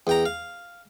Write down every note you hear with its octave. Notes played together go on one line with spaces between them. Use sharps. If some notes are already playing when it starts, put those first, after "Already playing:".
E2 G5 A#5
F5